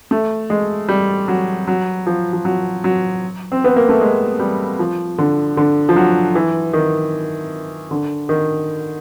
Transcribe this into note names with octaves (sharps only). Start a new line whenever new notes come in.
A3
G#3
G3
F#3
F#3
F3
F3
F#3
F#3
C4
B3
A#3
A3
G#3
G3
F3
D3
D3
F3
F#3
E3
D#3
D3
D#3